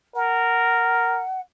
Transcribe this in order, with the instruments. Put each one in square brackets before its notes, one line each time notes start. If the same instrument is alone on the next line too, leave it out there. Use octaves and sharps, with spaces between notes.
[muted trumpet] A#4 [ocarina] F#5